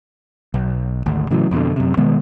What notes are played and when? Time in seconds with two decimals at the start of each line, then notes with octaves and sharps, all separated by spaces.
0.54 B1
1.06 G#1 D2
1.31 A2 C#3 E3 F#3
1.51 F2 B2 D3
1.76 F#2 C3
1.97 B2 D#3 G#3 B3